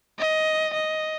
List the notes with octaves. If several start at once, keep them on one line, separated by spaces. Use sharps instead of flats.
D#5
D#5